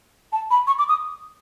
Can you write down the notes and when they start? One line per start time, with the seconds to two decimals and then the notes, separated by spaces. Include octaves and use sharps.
0.32 A5
0.50 B5
0.67 C#6
0.79 D6
0.89 D#6